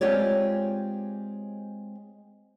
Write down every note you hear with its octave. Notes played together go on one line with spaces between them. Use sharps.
G#3 C4 F4 G4 C#5 D5